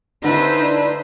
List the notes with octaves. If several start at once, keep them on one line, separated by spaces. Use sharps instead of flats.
C2 D3 D#4 E4 B4 C5
D4